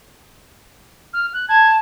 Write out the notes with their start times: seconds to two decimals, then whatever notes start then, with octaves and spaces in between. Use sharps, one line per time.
1.13 F6
1.34 F#6
1.48 A5 G#6